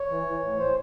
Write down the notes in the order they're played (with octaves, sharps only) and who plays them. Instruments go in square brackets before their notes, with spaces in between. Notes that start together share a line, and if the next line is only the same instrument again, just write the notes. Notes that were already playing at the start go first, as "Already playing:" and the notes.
Already playing: [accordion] C#5
E3
E3
A2
C5